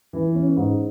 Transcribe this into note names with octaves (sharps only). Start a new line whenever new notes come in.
E3
C#4
G#2